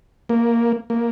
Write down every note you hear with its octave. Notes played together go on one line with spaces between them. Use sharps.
A#3
A#3